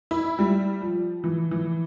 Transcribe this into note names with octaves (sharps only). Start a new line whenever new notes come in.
E4
G3
F3
E3
E3